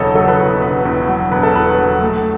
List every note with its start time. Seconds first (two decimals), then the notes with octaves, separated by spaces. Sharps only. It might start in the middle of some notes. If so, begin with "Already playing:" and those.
Already playing: E1 E2 C#3 F#3 A4 C#5 D#5
0.15 F#3 A4
0.28 B4
0.39 E2
0.62 E1 B4
0.85 E2
1.09 F#3
1.31 E1 B4
1.43 A4
1.54 E2 B4
1.78 F#3
2.01 A3